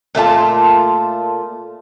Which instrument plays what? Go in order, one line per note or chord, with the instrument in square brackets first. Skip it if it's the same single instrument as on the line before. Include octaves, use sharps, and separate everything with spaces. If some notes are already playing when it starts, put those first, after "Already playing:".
[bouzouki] A#2 A3 F4 A5